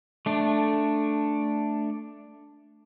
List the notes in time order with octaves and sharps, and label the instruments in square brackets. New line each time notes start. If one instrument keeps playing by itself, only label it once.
[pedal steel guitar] A3 D4